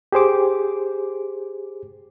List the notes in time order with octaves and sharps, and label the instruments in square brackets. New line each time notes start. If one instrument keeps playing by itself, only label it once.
[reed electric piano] G4 G#4 C5 D6